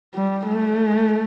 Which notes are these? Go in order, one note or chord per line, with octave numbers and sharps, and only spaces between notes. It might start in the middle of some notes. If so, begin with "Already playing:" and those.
G3
A3